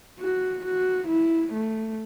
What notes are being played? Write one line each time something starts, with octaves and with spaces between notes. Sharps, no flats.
F#4
F#4
E4
A3